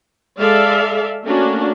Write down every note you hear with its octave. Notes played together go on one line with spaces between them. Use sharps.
G#3 A4 D5 E5 F5
A3 A#3 C#4 D4 F#4